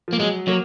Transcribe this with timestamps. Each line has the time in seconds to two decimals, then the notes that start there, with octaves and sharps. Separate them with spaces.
0.08 F3 A#3
0.19 F#3 G#3
0.48 F#3 A#3